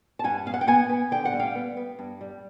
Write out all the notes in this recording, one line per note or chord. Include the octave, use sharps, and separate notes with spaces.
A5
G2 F#5 G#5
B3 F5
F#5
G5
B3 F#5 G#5
B3
D3 G5
F#5
G3
F5 G5
B3
B3
G2
G3